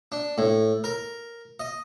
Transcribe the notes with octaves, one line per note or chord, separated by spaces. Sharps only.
D4
A2
A#4
D#5